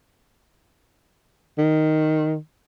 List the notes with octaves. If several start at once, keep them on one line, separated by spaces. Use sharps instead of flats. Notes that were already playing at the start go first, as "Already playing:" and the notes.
D#3